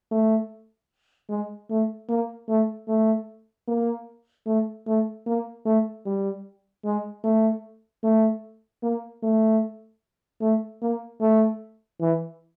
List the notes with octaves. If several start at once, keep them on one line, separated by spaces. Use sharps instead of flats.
A3
G#3
A3
A#3
A3
A3
A#3
A3
A3
A#3
A3
G3
G#3
A3
A3
A#3
A3
A3
A#3
A3
E3